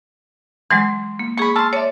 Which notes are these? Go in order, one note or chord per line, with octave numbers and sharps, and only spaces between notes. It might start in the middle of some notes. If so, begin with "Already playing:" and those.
E3 F#3 G#3 C6
A#3
A#3 G#4 B5 C#6
A5 C6 E6 F6
C#5 D5 E5